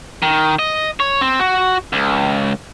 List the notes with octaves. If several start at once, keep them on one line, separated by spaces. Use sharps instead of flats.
D#3
D#5
C#5
C4
F#4
C#2